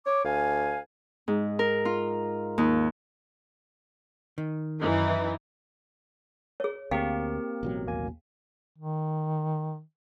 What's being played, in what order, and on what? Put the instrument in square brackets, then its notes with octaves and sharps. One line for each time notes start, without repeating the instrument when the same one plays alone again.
[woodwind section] C#5 D6
D2 F5 G#5
[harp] G#2
A#4
F4
D#2
[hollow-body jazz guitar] D#3
[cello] F#2 D#4 [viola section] E3
[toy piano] G#4 C#5
[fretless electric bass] D2 [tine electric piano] A#3 [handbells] C4 G4 A#4 [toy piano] F5 G5
[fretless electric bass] A1 B2 F#3
[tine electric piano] D#2 A#3 G#5
[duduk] D#3